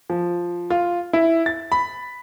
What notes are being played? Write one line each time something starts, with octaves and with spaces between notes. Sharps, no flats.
F3
F4
E4
A6
B5